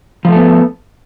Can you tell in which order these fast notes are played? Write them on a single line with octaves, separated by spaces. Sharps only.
F3 A3 A4 B3